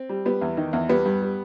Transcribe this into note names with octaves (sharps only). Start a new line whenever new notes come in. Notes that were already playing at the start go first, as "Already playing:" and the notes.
Already playing: C4
G3
G3 B3
E2
D#3
E2
G3 B3
G2
G3